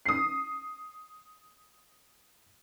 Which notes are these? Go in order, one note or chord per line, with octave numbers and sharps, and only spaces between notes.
D#6 C7